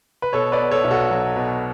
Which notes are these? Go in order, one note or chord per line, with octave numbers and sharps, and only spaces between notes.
B4
B2 A4 C#5
B4 D5
B3
A4 C#5
B1
F#4 A4
F#3
B2